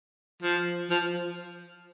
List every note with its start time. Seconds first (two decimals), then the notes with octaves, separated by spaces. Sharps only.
0.42 F3
0.90 F3